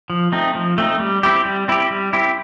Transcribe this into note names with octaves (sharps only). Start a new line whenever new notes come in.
F3
A3 C4 D#4
F3
A3 C4 D#4
G3
C4 E4 G4
G3
C4 E4 G4
G3
C4 E4 G4